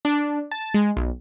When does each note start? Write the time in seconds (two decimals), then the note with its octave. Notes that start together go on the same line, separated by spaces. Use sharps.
0.05 D4
0.51 A5
0.74 G#3
0.97 B1